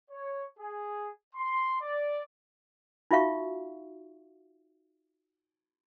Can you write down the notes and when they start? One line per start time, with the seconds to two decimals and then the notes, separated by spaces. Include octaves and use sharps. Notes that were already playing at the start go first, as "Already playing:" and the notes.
0.10 C#5
0.58 G#4
1.35 C6
1.81 D5
3.11 D#4 F4 F#4 E5 F5 C#6